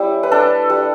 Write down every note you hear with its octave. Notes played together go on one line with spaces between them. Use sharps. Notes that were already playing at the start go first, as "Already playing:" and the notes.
Already playing: G3 C#4 E4
B4
D4 A4
G3